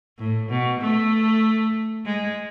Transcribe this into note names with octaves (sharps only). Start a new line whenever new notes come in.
A2
B2
A3
G#3